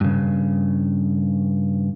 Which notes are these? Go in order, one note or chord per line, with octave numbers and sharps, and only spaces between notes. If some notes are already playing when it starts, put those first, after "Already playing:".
G2 C#3